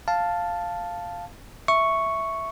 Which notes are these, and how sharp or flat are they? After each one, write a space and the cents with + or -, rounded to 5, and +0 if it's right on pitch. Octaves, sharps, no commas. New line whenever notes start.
F5 +0 A5 +0
E5 +0 C#6 +0